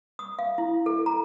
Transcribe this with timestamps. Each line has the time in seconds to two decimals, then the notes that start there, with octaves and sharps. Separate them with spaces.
0.19 D#6
0.39 F5
0.58 E4
0.86 A4
1.06 A#5